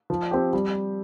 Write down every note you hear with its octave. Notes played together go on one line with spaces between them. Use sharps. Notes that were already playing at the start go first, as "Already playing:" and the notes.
F3
C4 G4
G3